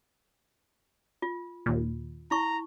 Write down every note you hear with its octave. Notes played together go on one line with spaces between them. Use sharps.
F4
D#2 A#2
E4 A#5 C#6